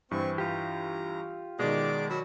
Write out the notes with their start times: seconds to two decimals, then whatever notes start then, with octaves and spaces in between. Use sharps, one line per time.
0.11 G2 E3 C4 C#6
0.38 F4 G4 A#5
1.59 B2 D#3 G#3 D5 D6
2.10 F#3 B5 E6